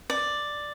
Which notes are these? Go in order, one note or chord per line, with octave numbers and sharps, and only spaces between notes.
D5